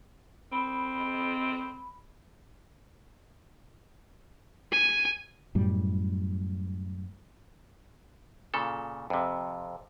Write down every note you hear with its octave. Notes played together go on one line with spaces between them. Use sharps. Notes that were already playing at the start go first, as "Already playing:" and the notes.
C4 B5
G#5
F#2 A2 G3
A#2 C#3 A4
F2 C3